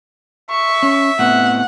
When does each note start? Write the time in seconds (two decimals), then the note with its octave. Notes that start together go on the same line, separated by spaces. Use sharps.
0.51 E5 C#6
0.83 C#4
1.19 A2 B3 C4 F#5